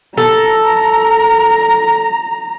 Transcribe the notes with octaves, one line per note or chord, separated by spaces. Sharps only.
A4 A#5